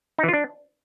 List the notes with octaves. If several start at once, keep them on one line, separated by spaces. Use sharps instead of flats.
D#4
E3
F4
D4